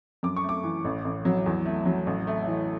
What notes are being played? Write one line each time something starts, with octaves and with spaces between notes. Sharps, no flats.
F#2 D6
C#6
A3
D6
E3
A1
A1
F#3
E2
A3
F#3
A1
A3
E3